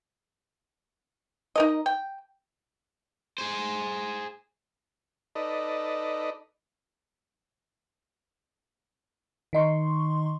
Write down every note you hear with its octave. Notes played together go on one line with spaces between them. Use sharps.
D#4 A#4 D#5
G5
G#4 C5
D#4 A4 B4 D5 D#5
D#3 D#4 C6 C#6